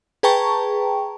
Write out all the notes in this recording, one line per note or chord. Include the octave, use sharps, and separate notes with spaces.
G#4 B4 G5 A5 A#5 C#6